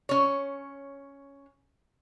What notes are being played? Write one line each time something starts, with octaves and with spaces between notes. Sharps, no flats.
C#4 C#5